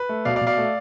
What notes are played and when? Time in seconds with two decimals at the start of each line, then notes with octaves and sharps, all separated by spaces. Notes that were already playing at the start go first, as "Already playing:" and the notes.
Already playing: B4
0.09 A3
0.25 B2 D5 F5
0.36 D5 F5
0.41 B2
0.47 D5 F5
0.58 A3